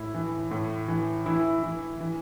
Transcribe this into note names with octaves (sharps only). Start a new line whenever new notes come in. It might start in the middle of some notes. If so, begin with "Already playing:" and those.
Already playing: A2 E4
E3
A2
E3
E3 E4
E3
E3